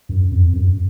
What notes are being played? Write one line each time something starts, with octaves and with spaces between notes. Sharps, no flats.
F#2
F2
F#2